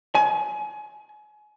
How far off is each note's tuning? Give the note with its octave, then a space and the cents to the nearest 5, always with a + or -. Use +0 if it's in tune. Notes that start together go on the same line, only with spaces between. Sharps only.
G#5 +30